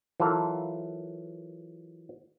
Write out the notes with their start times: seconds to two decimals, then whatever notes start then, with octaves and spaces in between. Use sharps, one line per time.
0.20 E3 F#3 F4 A4 A#4 A#5